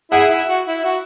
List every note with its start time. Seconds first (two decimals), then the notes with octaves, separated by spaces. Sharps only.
0.11 E4 G#4 F#5
0.30 E4
0.48 F#4
0.67 E4
0.85 F#4